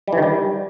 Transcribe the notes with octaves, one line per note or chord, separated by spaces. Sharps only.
G3
E3
D#3
G3